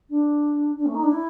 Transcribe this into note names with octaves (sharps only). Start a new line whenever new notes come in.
D4
D4
A3
D#4
D4
E4